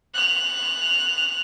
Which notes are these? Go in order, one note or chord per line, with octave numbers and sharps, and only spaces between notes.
F#6 F7